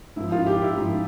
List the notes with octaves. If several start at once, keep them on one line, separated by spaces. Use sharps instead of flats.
G#2 F3 E4
F4
G4
E4
G#2 F3